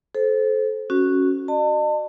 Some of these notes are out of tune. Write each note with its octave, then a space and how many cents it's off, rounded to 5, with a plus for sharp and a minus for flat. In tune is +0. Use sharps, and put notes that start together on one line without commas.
A4 -25 C5 +0
C#4 -5 F#4 +0
D#5 -45 A5 +35